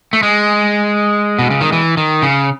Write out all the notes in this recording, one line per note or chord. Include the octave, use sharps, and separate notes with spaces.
A3
G#3
B2
C#3
D#3
E3
D#3
C#3